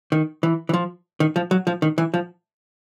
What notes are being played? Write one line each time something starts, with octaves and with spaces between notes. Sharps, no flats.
D#3
E3
E3
F3
D#3
F3
F#3
F3
D#3
E3
F3